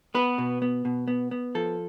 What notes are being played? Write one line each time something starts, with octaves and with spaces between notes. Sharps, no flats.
B3 B4
B2
B3
B2
B3
B3
F3 A4